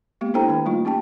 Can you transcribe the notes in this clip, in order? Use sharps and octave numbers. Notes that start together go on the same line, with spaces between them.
G#3 A#3 B3 G4
D4 E4 A4 C5 G5 A#5
D#3 G5
G3 A3 A#3 D#4 F4
C#4 G4 G5 A5